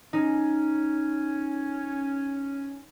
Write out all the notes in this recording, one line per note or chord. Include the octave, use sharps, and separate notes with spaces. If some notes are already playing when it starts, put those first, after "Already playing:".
C#4 D#4